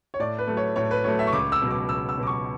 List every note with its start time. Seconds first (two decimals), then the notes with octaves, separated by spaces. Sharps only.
0.14 C#5
0.19 A2 D5
0.38 B4
0.47 F#3 A3
0.57 C#5
0.76 A2 C#5
0.91 B4
1.04 F#3 A3 C#5
1.19 E5
1.27 C#6
1.33 C#2 D6
1.52 E6
1.62 B2 F#3
1.71 D6
1.89 C#2 E6
2.09 E6
2.18 B2 F#3 D6
2.27 C#6